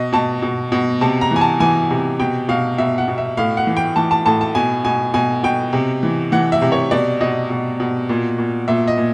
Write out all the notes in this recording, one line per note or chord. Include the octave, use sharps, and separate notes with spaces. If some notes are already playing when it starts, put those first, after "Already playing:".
Already playing: B2 D#5
B2 A5
B2
B2
C3 A5
A#5
E3 G#5
A5
E3 G#5
C3
B2 G5
B2 F5
B2 E5
F#5
B2
E5
A2 F5
F#5
E3
G5
E3 A5
A5
A2 A5
A5
B2 G#5
B2 G#5
B2 G#5
B2 G5
C3
E3
E3 F#5
E5
C3
C#5
B2 D5
B2 D#5
B2
B2
A#2
A#2
A#2 E5
D#5
A#2